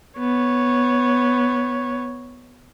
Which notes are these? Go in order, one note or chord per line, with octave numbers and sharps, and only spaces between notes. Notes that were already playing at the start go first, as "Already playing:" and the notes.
B3 C#5